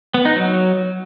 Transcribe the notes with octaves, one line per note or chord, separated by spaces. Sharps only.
B3
D#4
F#3